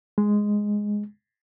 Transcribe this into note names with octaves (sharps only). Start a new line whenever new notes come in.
G#3